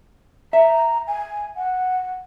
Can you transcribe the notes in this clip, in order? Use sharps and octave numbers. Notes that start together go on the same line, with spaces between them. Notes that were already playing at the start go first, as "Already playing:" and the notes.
E5 A#5
G#5
F#5